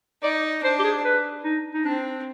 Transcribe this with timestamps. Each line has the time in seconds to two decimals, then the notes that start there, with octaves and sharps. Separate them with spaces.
0.22 D#4 D5
0.64 D4 C5
0.79 G4
0.84 G#4
1.04 B4
1.44 D#4
1.74 D#4
1.85 C4 D4